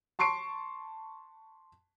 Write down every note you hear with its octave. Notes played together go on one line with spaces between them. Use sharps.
A5 C6 C#6 C7 D7